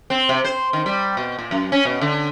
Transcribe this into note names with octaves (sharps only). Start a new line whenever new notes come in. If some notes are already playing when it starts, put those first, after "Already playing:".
C4
C3
C5
D#3
G3
B2
A#2
F#2
C#4
B2
D3